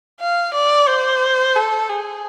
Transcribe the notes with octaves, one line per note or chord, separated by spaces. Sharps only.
F5
D5
C5
A4
G#4